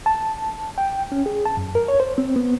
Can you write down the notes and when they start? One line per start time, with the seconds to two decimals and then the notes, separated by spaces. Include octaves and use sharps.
0.06 A5
0.78 G5
1.12 C#4
1.26 G#4
1.45 A5
1.57 F#2
1.75 A#4
1.88 C#5
2.00 C5
2.18 C4
2.36 B3